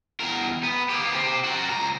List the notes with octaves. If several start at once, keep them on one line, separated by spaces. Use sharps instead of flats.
E2 A#4
B3
A#3 G4
C4 G4
F#4 A#4
C#2 A#5